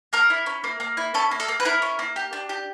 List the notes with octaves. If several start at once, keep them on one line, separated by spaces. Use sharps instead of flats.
A#3 A#4
E4
C#4
A#3
A#3
E4
C#4 A4
A#3
A4
A#3
B4
E4 A#4
C#4
A#3
G4
D4
G4